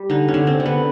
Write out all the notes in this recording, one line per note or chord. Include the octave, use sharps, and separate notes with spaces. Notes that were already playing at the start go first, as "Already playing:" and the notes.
Already playing: G3 G4
D3 D#4
C#4
D3
C4
D3
B3